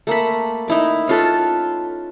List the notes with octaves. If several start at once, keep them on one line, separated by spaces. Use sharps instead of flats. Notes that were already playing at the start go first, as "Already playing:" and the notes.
A3 A#3 A4 B5
D#4 E4 D6
C#4 F4 A4 B4